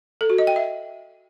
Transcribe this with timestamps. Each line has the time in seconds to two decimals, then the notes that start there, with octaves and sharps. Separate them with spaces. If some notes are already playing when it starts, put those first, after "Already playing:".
0.21 A4
0.30 F#4
0.38 D#5
0.47 G5
0.56 E5